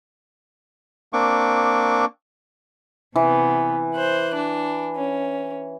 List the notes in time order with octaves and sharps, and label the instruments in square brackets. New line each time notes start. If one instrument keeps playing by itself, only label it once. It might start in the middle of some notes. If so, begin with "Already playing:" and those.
[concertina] A#3 C4 D4 C#6 D6
[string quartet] C3 B3 [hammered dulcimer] E3
[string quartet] C5 F#6
D4
C#4